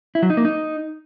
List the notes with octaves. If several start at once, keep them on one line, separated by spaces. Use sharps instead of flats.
E4
F#3
D#4
A#3
D#4